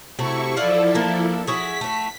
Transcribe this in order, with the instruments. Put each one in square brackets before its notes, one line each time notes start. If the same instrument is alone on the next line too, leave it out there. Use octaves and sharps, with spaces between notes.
[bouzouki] C3 A3 F#4 [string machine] E4 C#6
[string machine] F3 E4 A4 [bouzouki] F4 D5 F#5
[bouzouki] A#3 D4
[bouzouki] E4 F#4 G#4 [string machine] B6
[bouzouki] A3 F#4